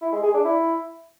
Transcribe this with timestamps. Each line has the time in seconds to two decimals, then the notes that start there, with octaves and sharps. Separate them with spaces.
0.02 E4
0.12 G#3
0.23 G#4
0.34 D4
0.45 E4